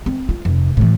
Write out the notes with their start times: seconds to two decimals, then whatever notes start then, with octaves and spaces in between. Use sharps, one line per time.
0.06 C4
0.29 F4
0.45 F1
0.77 A2 E3